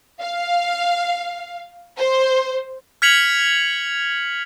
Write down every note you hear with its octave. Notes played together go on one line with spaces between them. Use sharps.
F5
C5
F6 G#6 B6 C#7 F7 F#7